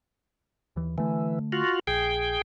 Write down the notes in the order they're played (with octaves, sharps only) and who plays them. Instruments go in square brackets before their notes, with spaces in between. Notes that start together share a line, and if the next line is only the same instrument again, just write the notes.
[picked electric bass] D#2 E3
[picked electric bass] D3 A3 [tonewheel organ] E3
[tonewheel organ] F4 F#4
[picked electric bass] A#1 [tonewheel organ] G#4 G5